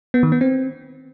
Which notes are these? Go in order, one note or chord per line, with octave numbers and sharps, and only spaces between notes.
B3
D#3
B3
C4